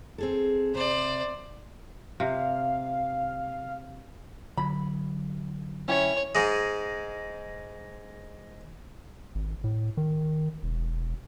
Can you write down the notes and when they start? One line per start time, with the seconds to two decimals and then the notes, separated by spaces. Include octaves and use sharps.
0.18 C4 G#4 A4
0.74 C3 C5 D5
2.20 C3 F5
4.57 D3 F#3 B5
5.88 C#4 E4 C#5 G5
6.35 G#2 G#3
9.35 G#1
9.64 A2
9.97 D#3
10.63 E1